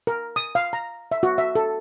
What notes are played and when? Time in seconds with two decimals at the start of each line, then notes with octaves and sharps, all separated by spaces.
0.07 A#4
0.36 D#6
0.55 F5
0.73 A#5
1.11 E5
1.23 F#4
1.38 E5
1.55 A4